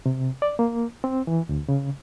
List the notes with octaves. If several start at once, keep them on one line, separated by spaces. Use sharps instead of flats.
C3
D5
A#3
C4
E3
D2
C#3